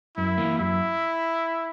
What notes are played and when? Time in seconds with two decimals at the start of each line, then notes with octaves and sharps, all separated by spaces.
0.17 F#2 E4
0.38 E3 A#3
0.58 F#2 E4